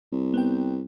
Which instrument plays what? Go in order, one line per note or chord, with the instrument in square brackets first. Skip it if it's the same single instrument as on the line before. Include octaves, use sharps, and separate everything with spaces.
[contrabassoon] C2
[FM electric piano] B3 G5